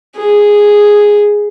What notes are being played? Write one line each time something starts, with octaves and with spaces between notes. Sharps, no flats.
G#4